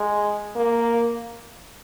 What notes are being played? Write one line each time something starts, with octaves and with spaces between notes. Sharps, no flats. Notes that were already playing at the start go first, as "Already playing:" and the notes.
Already playing: G#3
A#3